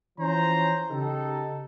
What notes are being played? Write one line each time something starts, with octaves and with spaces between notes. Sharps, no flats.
E3 F3 C#4 C5 A#5
C#3 D#4 G4 A4